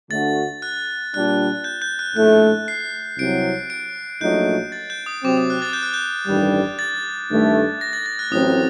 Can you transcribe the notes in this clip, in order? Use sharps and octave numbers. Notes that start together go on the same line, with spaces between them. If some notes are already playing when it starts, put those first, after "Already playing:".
D2 D3 A3 D4 F#4 A6
F#6
A#2 G3 D4 F#6
G6
G6
F#6
A#1 A2 A3 F#6
C7
C2 C3 F#3 D7
D7
A#1 A#2 F#3 A3 D#4 G6
A6
G6
D#6
C3 F#3 C4 D6
D#6
F#6
A6
G6
F#6
G6
A1 G2 D#3 G3
A6
G2 D#3 A3
A#6
A6
A6
F#6
A1 A2 F#3 C4 D#6